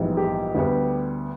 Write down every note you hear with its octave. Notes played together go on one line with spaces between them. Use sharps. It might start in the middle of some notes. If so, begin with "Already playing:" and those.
Already playing: A#1 G#2 E3 G3 B3
G4
D2 D3 G3 B3